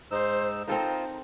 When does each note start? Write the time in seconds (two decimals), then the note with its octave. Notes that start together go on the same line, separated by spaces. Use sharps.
0.11 G#2 D#4 C5 E6
0.68 C4 D#4 F4 A4 A#4 C5